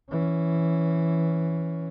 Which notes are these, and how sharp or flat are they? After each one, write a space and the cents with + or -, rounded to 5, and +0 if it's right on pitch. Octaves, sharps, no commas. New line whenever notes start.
E3 +0 C#4 +0